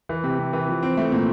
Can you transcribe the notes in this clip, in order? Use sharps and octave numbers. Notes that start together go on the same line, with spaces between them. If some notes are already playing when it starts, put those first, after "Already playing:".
E3
C3
C3
E3
F3
C4
A3
A#2